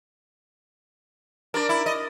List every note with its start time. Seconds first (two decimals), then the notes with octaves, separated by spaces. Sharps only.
1.54 D4 A#4 D5
1.69 E4
1.86 D#5